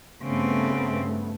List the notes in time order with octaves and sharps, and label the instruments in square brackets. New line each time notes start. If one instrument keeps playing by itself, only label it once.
[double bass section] G2 A3 B3 [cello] C#3 C4